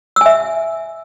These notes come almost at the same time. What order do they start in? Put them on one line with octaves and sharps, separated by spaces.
E6 G#5 E5